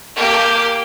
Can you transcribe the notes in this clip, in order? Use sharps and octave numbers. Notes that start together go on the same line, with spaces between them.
A#3 G4